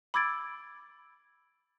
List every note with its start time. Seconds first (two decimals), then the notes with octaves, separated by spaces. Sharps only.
0.14 B5 D6 E6 G#6 A6 D7